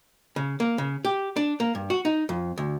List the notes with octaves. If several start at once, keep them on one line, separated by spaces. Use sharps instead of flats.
C#3
A#3
C#3
G4
D4
A#3
G2
F#4
D#4
F2
D2